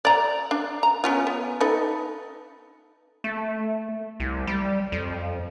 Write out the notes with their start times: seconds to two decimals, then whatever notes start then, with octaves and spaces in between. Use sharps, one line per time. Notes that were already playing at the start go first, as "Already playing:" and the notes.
0.05 D5 A#5
0.51 D4
0.83 A#5
1.04 B3 C#4 F4
1.27 B3
1.61 D#4 A4 B4
3.24 A3
4.20 C2
4.47 G3
4.92 F2